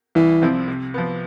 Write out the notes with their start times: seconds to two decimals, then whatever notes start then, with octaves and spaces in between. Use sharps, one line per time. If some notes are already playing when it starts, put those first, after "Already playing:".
0.15 C2 E3
0.42 C3 F3 C4 E4
0.68 C3
0.94 F3 B3